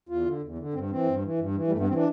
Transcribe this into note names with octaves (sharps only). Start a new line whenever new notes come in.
E2 F4
D3
E2
D3
G2 C4
E3 C4
G2
E3
G2
E3
G3
G2 A3
B3
E3 C4
D4